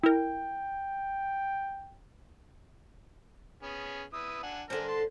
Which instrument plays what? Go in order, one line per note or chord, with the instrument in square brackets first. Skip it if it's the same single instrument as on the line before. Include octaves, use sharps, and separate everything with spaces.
[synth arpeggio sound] E4 A#4 [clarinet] G5
[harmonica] B3 C#4 G#4
E4 B4 D#6
D4 F#5 G#5
[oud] D3 C5 [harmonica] D4 A#4 G#5
[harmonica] A5 C6